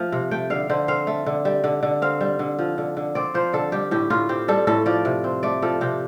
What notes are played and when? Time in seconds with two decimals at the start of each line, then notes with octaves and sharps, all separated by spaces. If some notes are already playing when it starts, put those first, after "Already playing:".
Already playing: F3 A3
0.12 C3
0.31 A3 G5
0.50 D3 F5
0.70 D3 C5
0.88 C4 F5
1.07 A3
1.26 D3
1.45 G3
1.64 D3
1.83 D3
2.02 C4 F5
2.21 G3
2.39 D3
2.59 F3
2.78 D3
2.97 D3
3.15 C4 D5
3.34 F3 C5
3.53 D3 A4
3.72 G3 G4
3.91 A2 G4
4.10 A2 F4
4.29 C4 G4
4.48 G3 A4
4.67 A2 A4
4.86 F3 D5
5.05 C3
5.24 C4
5.43 A3 D5
5.62 F3 A4
5.81 C3 G4